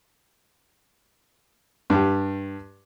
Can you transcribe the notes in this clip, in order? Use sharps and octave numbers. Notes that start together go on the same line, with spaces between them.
G2 G4